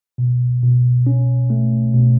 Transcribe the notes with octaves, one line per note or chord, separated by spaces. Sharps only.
B2
B2
C#4
A3
B2